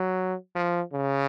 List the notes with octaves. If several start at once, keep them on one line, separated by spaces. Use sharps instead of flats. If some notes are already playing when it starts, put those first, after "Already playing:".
Already playing: F#3
F3
C#3